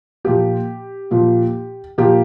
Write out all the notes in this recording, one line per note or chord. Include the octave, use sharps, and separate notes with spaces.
A#2 F3 A#3 G4
A#2 F3 A#3
A#2 F3 A#3 G4